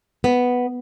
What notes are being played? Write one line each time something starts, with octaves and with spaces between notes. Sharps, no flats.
B3